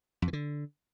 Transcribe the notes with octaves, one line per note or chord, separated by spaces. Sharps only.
F2
E3
D3